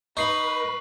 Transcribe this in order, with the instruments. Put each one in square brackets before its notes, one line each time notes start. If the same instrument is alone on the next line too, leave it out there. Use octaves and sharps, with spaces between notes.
[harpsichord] D#4 [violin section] B4 [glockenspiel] C#6 C7 F#7